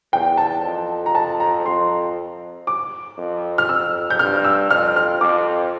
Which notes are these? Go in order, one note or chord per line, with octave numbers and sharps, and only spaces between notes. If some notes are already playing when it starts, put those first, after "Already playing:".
E2 G5
A5
F2
A#5
A5
A#5
F2 C6
D6
F2
F6
F2 E6
G6
G2 F6
E6
F2 F6
F6
F2 D6